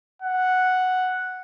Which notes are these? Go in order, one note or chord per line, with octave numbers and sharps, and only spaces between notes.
F#5